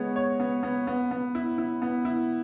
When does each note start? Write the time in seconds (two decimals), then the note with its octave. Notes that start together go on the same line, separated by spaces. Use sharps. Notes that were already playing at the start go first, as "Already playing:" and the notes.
Already playing: G#3 B3 C#5
0.16 C#5
0.40 B3
0.63 B3
0.87 B3
1.11 B3
1.35 E4
1.58 E4
1.82 B3
2.05 E4